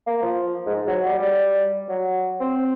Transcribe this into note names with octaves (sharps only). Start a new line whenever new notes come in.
A#3
F3
G#2
F#3
G3
G3
F#3
C4